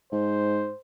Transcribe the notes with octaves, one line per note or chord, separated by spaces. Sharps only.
G#2 C5